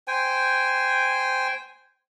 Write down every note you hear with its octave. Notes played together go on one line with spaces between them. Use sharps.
C5 G5 G#5